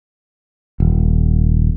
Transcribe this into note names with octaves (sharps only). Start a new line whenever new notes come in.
D#1